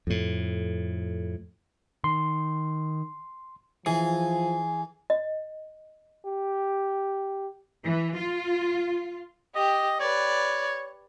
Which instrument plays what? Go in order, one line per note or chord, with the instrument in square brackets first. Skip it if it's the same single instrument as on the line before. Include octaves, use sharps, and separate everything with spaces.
[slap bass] F2 A2
[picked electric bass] D#3 [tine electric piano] C6
[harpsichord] E3 [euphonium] F3 [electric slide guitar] G#4
[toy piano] D#5
[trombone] G4
[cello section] E3
F4
[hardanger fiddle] G4 [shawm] D#5
[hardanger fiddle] B4 D5 [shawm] C#5